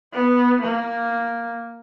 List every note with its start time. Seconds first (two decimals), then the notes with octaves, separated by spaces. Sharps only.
0.13 B3
0.62 A#3